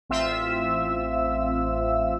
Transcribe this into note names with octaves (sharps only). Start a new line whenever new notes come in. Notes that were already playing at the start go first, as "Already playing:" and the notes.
A1 C4 F4 E5 E6